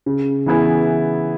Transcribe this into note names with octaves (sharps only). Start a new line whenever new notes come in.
C#3
E3 B3 E4 G#4